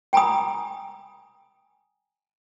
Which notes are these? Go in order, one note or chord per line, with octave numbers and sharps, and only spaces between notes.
G5 G#5 A#5 B5 D#6